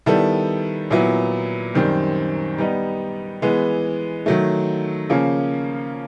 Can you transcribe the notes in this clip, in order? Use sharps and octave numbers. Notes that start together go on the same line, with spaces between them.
D#3 G3 B3 E4 A4
A#2 F#3 B3 E4
F#2 D#3 G3 C4
G3 B3 D#4 G4
E3 G#3 B3
D#3 F#3 A3
C#3 F3 A#3 C#4